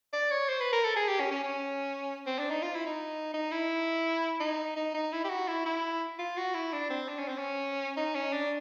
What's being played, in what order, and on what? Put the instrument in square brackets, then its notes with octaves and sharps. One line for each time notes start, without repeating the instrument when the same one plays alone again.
[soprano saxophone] D5
C#5
C5
B4
A#4
A4
G#4
G4
C#4
C#4
C#4
C4
D4
D#4
F4
E4
D#4
D#4
E4
D#4
D#4
D#4
E4
G4
F#4
E4
E4
F4
F#4
E4
D4
C4
D4
C#4
C4
C#4
D#4
C#4
D4